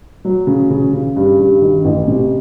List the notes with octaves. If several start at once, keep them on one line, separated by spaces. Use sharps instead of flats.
F#3
C#3
C#3
C#3
G2
G2
D#3
A1
C3